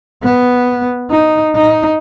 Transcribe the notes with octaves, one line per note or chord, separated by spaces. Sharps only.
B3
D#4
D#4